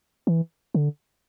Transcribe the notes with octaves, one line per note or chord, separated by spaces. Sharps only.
E3
D3